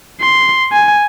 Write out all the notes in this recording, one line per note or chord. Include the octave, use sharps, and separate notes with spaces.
C6
G#5